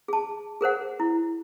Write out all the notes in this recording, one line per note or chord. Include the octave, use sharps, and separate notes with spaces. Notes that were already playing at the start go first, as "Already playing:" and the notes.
G#4 A5
G#4 A#4 C5 F#5
E4